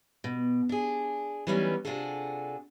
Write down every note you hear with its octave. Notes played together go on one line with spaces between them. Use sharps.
B2
D4 G#4
E3 F#3 G3 B3 C#4 D#4
C3 D4 F4 F#4 G#4 A4